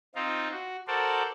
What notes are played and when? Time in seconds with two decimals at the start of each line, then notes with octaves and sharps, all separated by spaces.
0.15 C4 D#4 F4
0.52 F#4
0.87 F#4 A4 A#4 C5 D5